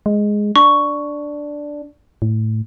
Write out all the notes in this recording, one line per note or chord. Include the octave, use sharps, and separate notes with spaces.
G#3
D4 C#6
A2